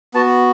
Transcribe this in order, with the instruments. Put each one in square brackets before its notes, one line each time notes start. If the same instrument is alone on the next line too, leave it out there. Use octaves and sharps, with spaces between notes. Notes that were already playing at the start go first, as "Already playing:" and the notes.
[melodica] B3 F#4 A5